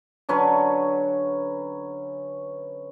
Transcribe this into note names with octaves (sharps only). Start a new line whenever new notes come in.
D3 F#3 C#4 B4